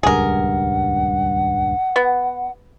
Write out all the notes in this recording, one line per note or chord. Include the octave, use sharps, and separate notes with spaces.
D#1 C#2 G2 G#4 A#4 F#5
B3